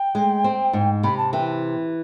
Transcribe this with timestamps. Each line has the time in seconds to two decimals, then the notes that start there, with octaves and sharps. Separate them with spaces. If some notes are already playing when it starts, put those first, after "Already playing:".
Already playing: G5
0.15 G#3
0.44 C4
0.73 G#2
1.03 C3 B5
1.18 A5
1.33 E3 G5